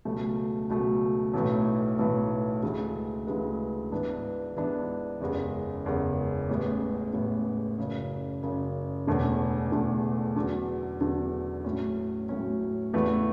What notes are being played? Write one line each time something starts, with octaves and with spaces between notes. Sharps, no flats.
C#2 B2 F#3 A3
C#2 B2 F#3 A3
B1 A2 E3 A3
B1 A2 E3 A3
D2 C#3 E3 G#3
D2 C#3 E3 G#3
G#2 E3 B3 D4
G#2 E3 B3 D4
F#1 E2 C#3 G#3
F#1 E2 C#3 G#3
A1 A2 G#3 B3
A1 A2 G#3 B3
F#1 F#2 C#3
F#1 F#2 C#3
E1 E2 D3 A3
E1 E2 D3 A3
E2 D3 F#3
E2 D3 F#3
A2 F#3 C#4
A2 F#3 C#4
E2 C#3 E3 A3